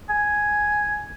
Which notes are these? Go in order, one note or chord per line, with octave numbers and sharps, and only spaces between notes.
G#5